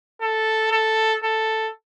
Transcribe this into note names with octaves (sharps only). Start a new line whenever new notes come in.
A4
A4
A4